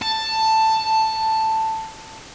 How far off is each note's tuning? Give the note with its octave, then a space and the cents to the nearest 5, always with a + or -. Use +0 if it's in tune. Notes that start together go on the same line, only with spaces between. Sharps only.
A5 +10